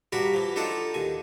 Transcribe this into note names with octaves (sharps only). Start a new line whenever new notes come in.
G2 F#4 A#4 D5 B5
E3 F3
D4 D#4 F4 A4 F#5
D#2 G#5